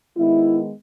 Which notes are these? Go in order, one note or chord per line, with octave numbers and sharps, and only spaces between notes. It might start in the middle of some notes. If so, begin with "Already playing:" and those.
D#3 G#3 B3 E4